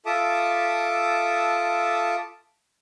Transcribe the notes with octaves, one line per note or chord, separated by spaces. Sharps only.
F4 A4 E5 A5 D6 D#6